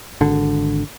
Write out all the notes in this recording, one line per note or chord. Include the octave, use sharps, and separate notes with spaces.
G#1 D3